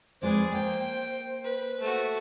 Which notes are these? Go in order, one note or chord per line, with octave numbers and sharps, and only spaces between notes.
F2 G#3 G#4 B4 C5 D5
A#3 G5
B4
A3 F#4